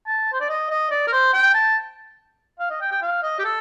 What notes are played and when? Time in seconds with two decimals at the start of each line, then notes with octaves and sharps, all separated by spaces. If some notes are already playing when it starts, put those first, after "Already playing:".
0.07 A5
0.33 C5
0.41 D5
0.49 D#5
0.70 D#5
0.91 D5
1.07 A#4
1.13 C5
1.34 G5
1.54 A5
2.60 F5
2.70 D#5
2.81 G5
2.91 G5
3.02 F5
3.23 D#5
3.39 G4
3.45 A4